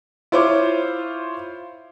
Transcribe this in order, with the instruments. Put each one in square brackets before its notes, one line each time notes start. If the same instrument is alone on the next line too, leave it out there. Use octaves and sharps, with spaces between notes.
[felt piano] E4 F4 C5 C#5 D6